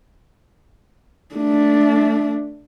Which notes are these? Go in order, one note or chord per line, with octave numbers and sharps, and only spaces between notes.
A3 D4